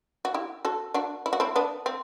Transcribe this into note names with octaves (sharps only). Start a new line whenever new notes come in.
F#4
E4 G4
F#4 A4
D4 F#4
E4
F#4
C4 E4
B3 D4
C4